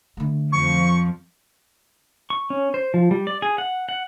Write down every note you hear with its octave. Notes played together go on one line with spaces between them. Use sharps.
D3 A3
F2 F3 C#6
C#6
C#4
C5
F3
G3
D5
G#4
F#5
F#5